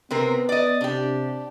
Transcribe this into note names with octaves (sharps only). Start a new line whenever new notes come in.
C3 B3 C4 A#4
D5 D#5
C3 D4 G4